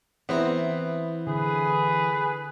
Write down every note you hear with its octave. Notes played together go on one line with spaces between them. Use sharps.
E3 B3 C4 E4 A#5
D3 G#4 B4